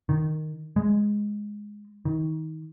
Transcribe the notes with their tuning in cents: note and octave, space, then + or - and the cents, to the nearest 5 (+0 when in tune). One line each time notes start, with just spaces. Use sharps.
D#3 -10
G#3 +0
D#3 +25